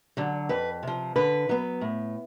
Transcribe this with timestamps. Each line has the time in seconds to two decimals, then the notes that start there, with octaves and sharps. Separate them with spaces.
0.17 D3 F#3
0.49 F2 B4
0.83 C3 F3
1.16 D3 B4
1.49 F#3 B3
1.81 A2